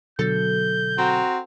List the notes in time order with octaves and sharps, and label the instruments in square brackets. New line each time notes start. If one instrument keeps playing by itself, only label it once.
[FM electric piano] B2 D3 F#3 [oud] A4 [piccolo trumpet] G6
[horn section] C4 F#4 A#5